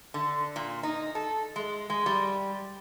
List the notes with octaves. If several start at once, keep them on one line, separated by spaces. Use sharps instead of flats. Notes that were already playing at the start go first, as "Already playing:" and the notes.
D3
A#2
D#4
A4
G#3
G#3
G3